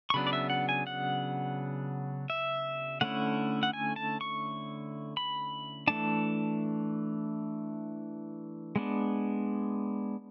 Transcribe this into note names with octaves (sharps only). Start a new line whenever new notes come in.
C#6
C#3 F#3 B3 D4 B5
D5
E5
F#5
G#5
F#5
E5
D3 A3 C#4 E4 F#5
F#5
G#5
A5
C#6
B5
E3 A3 D4 A5
G#3 B3 D4